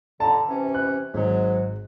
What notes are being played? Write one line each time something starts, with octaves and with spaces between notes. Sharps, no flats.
D3 A5 A#5
C3 E3 C#4
F#6
G#1 G#2 F#3